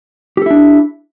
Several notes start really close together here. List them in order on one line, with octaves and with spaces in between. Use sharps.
G4 A4 E4 D4